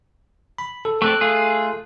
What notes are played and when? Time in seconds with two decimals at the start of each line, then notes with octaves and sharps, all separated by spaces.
0.58 B5
0.85 A4
1.02 A3 C4 A4 D5 F#6
1.21 A3 F4 G#4